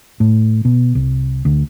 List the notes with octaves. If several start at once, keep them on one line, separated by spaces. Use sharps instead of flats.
A2
B2
C2
D2